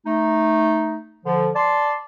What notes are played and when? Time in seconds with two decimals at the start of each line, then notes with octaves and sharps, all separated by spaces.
0.06 A3 D#4
1.26 D3 F3
1.56 D5 A5 C6